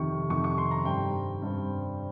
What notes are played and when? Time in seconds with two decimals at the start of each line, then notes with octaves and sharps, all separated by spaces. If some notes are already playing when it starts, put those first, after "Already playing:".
Already playing: F2 C3 D#3 C#6
0.30 F2 C3 D#3 C#6
0.44 C#6
0.58 C6
0.71 A#5
0.85 G2 G3 C4 G5
1.42 G2 G3 C4